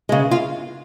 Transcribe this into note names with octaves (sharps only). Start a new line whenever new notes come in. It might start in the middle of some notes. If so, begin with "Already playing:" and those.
C#3 G#3
F4